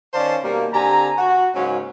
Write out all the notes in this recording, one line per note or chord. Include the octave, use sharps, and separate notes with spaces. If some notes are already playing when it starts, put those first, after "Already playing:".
D#3 C#4 C5 D5 F5 A5
B2 D#3 G3 A#3
D3 C4 G4 G#5 A#5
F#4
G#2 C#3 F#3 A#3 C#4